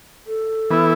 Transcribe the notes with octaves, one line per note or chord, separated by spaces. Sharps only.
A4
E3 B3 E4